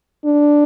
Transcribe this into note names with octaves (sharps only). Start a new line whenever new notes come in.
D4